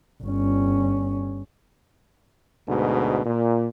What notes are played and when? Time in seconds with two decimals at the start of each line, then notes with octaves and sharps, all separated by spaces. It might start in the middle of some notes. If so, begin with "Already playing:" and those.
0.23 G1 C#4
2.67 D2 G#2 B2
3.24 A#2